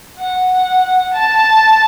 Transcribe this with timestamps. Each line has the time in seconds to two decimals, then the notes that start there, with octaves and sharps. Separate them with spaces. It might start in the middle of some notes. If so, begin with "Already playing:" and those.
0.18 F#5
1.13 A5